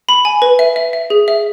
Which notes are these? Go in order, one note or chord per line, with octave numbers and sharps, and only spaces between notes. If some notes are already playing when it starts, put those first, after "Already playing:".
B5
G#5
B4
E5
E5
E5
G#4
E5